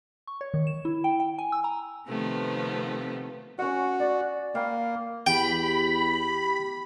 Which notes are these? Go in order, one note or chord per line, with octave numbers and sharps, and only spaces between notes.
C#6
C#5
D#3
E7
E4
G5
G5
G#5
E6
A#5
C3 D#3 F3 A3 B3 C4
C#4 F#4 F#5
D5
A#3 B4 F5 G5
E2 G4 G5 B5